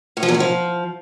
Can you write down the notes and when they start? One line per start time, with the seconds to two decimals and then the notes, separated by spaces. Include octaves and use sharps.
0.17 A2
0.23 F3
0.29 E2
0.34 A2
0.40 F3